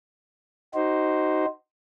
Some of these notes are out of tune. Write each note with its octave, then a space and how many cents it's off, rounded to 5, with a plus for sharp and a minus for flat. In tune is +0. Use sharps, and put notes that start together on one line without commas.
D#4 +0 F#4 +30 C5 +0